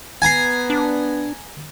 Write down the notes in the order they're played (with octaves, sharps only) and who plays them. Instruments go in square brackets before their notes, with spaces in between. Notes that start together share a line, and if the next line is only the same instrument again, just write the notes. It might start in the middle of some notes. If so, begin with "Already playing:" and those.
[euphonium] B3 [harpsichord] G#5 A#5 [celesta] G#6 C7
[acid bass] D4